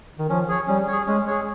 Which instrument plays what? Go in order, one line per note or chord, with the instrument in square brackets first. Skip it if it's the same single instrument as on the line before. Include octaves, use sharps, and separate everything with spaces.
[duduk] D#3
[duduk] F3 [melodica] C#4
[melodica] G#4 C#5
[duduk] G3 [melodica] C#4
[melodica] G#4 C#5
[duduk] G#3 [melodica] C#4
[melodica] G#4 C#5